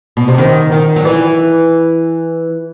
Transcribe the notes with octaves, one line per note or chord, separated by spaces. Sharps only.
B2
C3
D#3
D#3
F#3
E3